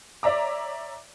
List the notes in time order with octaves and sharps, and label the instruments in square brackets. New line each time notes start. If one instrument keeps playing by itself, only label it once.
[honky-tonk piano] C#5 D5 E5 A#5 D6